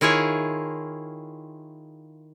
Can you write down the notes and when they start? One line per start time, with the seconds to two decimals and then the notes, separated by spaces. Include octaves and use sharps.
0.01 D#3 E4 F4 G#4 C#5